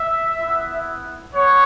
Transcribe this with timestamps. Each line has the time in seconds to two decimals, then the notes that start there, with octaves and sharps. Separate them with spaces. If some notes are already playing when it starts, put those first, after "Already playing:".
Already playing: E5
0.40 B3 E4
1.34 B3 C#5